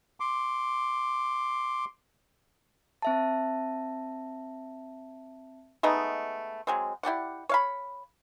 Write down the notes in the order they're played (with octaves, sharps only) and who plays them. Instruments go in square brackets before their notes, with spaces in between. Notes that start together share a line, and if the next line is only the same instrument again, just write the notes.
[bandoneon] C6 D6
[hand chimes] C4 E5 A5
[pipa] G#3 A3 B3 D#4
F#3 G#3 C4
E4 G4 D5 F#5
C#5 F5 B5